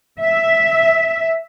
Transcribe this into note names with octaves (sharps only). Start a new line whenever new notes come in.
E5